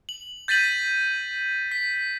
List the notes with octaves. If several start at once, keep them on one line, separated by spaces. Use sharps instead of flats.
F#7
G6 A6 B6 D#7 F#7
B6